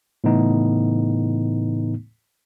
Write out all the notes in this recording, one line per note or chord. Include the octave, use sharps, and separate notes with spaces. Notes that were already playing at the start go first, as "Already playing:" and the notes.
A2 C#3 E3 A3 B3 D#4